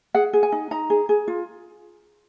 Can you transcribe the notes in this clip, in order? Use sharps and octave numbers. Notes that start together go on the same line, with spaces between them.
G#4 F#5
G#4
G#5
D#4
D#4 A#5
G#4
G#4
F4